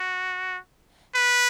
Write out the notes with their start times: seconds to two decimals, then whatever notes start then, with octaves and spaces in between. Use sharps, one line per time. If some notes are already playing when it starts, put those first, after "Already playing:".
Already playing: F#4
1.16 B4